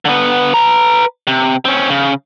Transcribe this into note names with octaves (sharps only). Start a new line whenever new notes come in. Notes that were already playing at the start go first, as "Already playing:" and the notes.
D3 B3
B4 A#5
C3
C4 C#4
C#3